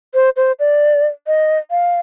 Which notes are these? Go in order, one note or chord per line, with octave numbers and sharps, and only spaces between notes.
C5
C5
D5
D#5
F5